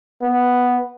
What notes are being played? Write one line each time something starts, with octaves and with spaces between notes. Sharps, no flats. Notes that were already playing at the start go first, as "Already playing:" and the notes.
B3